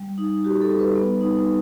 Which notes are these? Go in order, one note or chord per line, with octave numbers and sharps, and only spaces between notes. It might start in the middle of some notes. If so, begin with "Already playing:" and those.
Already playing: G3
D#4
F#4 G4
A4
G3
B4
B3
D#4